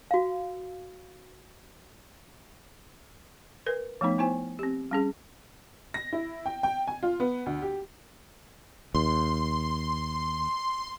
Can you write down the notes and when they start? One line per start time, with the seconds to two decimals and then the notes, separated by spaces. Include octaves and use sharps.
0.11 F#4 F5
3.66 A#4 B4
4.01 F3 A3 B3 D#4
4.18 B3 D#4 E4 C5 G#5
4.59 C4 G4
4.91 G3 C#4 G#4
5.94 A#6
6.13 E4
6.46 G5
6.63 G5
6.87 G#5
7.03 F4
7.20 B3
7.46 D2
7.62 G4
8.95 D#2 C6